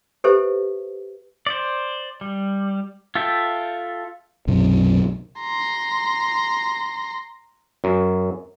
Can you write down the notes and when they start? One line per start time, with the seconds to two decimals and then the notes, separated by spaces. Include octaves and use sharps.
0.24 G4 A4 B4 C5 E5
1.47 C5 D5
2.21 G3
3.15 F4 A4 E5 G5
4.47 B1 F#2 C3
5.40 A#5 C6
7.84 F#2